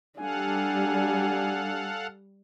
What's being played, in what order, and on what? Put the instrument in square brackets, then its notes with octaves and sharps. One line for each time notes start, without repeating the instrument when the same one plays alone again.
[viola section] G3 [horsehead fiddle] D4 [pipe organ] A4 F5 F#5 [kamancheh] G#5